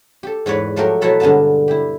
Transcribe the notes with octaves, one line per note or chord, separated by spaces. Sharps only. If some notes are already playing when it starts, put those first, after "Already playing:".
G4 A4
E2 G#2 B4 C#5 D5
F3 F#3 A3 F#4 G4 A#4
B2 F#3 E4 F#4 A4 B5
G2 D3 G#3 B3 A5
E4 G4